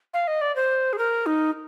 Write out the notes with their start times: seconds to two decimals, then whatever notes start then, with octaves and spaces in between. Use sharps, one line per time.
0.14 F5
0.27 D#5
0.41 D5
0.56 C5
0.93 G#4
0.98 A#4
1.26 D#4